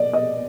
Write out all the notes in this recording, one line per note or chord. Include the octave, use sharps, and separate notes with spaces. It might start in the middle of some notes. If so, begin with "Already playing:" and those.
Already playing: D5 D#5
D#5